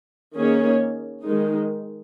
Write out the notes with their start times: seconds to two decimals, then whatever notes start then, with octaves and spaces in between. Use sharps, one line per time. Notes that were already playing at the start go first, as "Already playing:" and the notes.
0.38 D#3 A#3 C#4 G#4 C#5
1.25 D#3 G#3 D#4